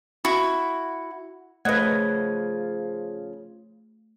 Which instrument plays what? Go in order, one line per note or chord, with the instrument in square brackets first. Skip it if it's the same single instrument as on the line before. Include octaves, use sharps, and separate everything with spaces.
[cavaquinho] E4 F#4
[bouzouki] C#3 F3 [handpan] A3 [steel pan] B4 D#5 F#5 [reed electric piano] G#6